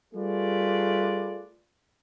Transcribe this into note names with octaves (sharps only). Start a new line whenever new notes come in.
G3 A3 F4 G#4 B4 D5